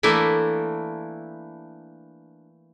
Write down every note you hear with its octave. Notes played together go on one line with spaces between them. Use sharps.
E3 A3 A#3 D4 E4